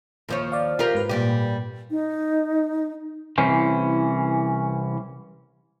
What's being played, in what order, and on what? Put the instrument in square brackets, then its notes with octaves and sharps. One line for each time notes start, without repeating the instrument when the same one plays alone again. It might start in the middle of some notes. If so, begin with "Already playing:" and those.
[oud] D#2 F3 C#5
[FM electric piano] D5 F5
[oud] F4 G4 A#4
[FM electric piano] G#2 B4
[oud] A#2 G3 G4
[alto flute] D#4
[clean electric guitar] C2 E3 C#4 C5